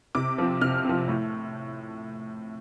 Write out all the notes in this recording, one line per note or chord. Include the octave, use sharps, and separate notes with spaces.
C3 D6
F3 C4
C3 F6
F3 C4
A2